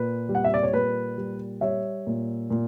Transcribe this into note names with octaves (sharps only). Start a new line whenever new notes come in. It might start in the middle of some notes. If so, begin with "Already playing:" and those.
Already playing: A#2 B4
G3
F#5
E5
D5
C#5
A#2 B4
G3
G3 C#5 E5
A#2
A#2